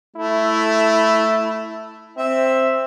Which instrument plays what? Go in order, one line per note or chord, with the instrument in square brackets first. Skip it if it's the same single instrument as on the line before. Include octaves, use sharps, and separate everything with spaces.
[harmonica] A3 [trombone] E4
[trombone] C4 [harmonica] E5